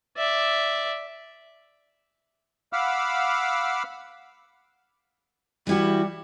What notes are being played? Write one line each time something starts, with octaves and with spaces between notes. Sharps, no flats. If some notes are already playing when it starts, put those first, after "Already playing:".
D5 E5
F5 F#5 B5 D6 E6 F6
E3 G3 E4 F#4